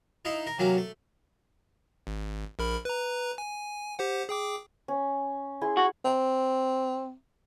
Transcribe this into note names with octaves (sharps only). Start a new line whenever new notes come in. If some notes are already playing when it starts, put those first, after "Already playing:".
D#4 E4 F5
A#4
C3 F#3 A#3 C#4
A3
G#1
A#1 A#4 B5
B4 A#5
G#5
G4 C5 F#5
G#4 G5 D6
C#4
E4 G#4 C6
F#4
C4